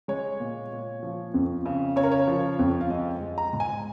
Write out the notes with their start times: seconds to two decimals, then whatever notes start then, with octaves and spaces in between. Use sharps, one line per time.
0.08 G#3 C#5
0.40 A#2
0.72 A#2
1.03 F3
1.34 F2
1.66 C#3
1.96 C#3 C#5
2.03 A#4
2.12 C#5
2.28 F3
2.59 F2
2.81 F5
2.90 G#3 D#5
3.21 G#3
3.38 A#5
3.53 G#2
3.60 G#5